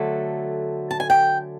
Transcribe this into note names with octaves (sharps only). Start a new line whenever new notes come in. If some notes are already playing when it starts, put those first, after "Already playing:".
Already playing: D3 F#3 A3
A5
G#5
G5